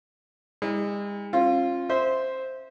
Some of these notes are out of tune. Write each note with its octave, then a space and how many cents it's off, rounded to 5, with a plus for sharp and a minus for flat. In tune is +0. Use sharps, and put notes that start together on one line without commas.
G#3 -40 E4 -40
C#4 -45 F4 +0
C5 +0 E5 -25 C6 -10